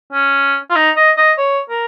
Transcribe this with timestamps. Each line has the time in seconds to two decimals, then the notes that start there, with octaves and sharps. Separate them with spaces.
0.12 C#4
0.70 F4
0.76 D#4
0.96 D#5
1.18 D#5
1.38 C#5
1.70 A#4